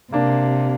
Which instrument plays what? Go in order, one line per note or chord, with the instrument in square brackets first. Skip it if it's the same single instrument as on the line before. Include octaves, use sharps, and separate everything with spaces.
[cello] C3 [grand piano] A#3 D4